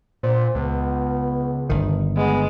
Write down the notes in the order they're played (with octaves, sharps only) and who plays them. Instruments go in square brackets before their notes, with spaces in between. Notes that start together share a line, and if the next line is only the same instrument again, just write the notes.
[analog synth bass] A#2 [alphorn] C5
[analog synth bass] C#2 [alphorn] B3
[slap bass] G1 D#3
[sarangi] G#3 [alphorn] B3